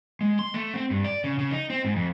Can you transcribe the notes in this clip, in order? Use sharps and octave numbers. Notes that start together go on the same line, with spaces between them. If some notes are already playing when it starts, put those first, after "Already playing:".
G#3
C6
A3
C4
G2
D5
C#3
C#3
D#4
C4
G#2
F2